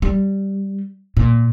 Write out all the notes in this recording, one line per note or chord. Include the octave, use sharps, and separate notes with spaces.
G3
A#2